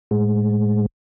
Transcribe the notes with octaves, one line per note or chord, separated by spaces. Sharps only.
A2 G#3